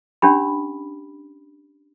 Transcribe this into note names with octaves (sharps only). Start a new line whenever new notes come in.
C#4 D4 G4 B5